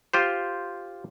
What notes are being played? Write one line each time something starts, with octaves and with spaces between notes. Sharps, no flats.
F4 G4 C5